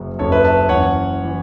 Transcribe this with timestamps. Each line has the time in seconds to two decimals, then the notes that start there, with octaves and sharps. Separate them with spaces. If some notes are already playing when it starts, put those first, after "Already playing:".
Already playing: F#1 F#2 C#3
0.19 F#1 F#2 C#3 A4 C#5
0.32 B4 E5
0.44 E5 A5
0.69 F#1 F#2 E3 C#5 F#5
1.24 E3